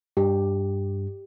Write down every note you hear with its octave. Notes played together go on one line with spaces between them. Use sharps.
G2 G4